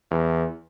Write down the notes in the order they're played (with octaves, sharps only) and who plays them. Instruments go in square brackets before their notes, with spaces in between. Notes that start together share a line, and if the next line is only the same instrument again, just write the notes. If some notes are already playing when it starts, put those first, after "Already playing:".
[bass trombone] E2